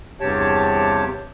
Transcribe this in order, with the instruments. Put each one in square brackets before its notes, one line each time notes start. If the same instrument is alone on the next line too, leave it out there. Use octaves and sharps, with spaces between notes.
[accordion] E2 G2 C3 G4 C#5 A5